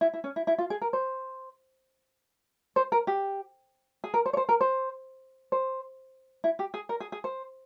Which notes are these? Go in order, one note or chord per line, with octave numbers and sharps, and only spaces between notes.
E4
E4
C#4
E4
E4
F4
G#4
A#4
C5
C5
A#4
G4
G#4
A#4
C5
C#5
C5
A#4
C5
C5
E4
G4
G#4
A#4
G#4
G#4
C5